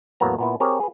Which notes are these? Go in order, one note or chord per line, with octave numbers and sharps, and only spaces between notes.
E2 A2 F#3 A#3 B3 A#5
A#2 B3 E4
C4 G4 G#4 A#4 C#5
G#4 B4